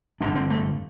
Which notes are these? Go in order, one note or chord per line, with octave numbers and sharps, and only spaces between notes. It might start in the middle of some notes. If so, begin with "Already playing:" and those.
G1 F2 D3 D4
C4
A3